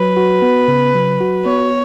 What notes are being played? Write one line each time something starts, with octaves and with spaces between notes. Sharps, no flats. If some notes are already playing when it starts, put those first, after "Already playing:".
Already playing: F#3 B4
F#4
B3
C#3
F#3
F#4
B3 C#5